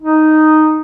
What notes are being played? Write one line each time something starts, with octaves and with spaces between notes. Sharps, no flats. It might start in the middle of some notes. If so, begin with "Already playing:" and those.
D#4